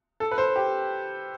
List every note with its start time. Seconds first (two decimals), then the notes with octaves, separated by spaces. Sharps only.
0.20 A4
0.31 B4
0.38 C5
0.56 G4